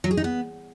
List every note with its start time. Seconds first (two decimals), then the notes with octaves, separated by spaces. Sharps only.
0.04 F#3
0.11 G#4
0.17 D#4
0.24 B3